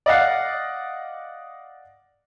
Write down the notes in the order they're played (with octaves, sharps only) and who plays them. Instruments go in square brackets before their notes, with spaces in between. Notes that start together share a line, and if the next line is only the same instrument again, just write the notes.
[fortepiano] D5 D#5 F5 F#5